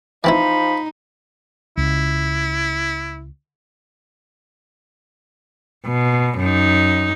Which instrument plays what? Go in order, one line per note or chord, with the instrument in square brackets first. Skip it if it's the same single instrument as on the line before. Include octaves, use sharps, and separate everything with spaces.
[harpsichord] E3 C4 E4 [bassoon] F3 [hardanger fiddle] D#4 [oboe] B5
[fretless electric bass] C#2 [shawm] E4
[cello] B2
F#2 D#4